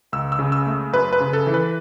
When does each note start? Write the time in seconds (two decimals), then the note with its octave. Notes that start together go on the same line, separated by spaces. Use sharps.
0.12 C#2 E6
0.32 E6
0.39 C#3
0.52 E6
0.67 A3
0.93 F#2 B4
1.13 B4
1.20 C#3
1.33 A4
1.47 E3
1.54 B4